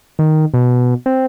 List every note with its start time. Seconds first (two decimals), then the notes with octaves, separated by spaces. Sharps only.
0.19 D#3
0.54 B2
1.06 C4